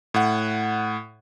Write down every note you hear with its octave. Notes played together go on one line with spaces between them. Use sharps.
A2 F#5